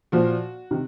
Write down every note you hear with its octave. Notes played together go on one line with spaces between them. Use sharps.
A#2 F3 F#4
C3 D#3